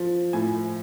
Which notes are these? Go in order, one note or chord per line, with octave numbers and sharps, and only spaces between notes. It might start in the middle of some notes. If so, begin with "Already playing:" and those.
Already playing: F3
A2 G#5